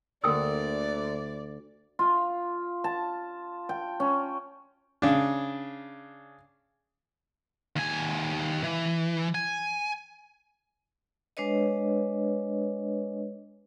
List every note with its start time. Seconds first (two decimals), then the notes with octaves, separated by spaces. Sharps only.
0.24 D2 D3 A#3 D5 G5 D#6 E6
1.99 F4
2.84 A5
3.69 G5
4.00 C#4
5.02 C#3 D4
7.76 D#2 G#5
8.64 E3
9.35 G#5
11.37 G#3 D4 B4 C#5 D#5